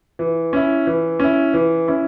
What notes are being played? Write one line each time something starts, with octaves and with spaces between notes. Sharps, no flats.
E3
C#4 E4
E3
C#4 E4
E3
C#4 E4